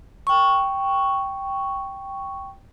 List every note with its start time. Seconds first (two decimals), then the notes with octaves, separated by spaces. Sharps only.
0.27 G5 C#6